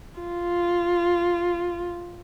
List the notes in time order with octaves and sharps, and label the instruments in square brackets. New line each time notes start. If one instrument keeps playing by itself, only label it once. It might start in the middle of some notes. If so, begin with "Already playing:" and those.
[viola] F4